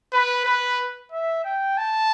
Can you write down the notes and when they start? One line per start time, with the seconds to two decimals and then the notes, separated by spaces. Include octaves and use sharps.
0.13 B4
0.45 B4
1.12 E5
1.45 G5
1.78 A5